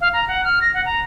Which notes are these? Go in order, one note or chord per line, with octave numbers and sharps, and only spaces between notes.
F5
A#5
F#5
F6
A#6
F#5
A#5